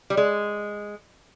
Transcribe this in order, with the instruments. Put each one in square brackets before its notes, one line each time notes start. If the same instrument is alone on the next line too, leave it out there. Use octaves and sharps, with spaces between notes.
[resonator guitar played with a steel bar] G3
G#3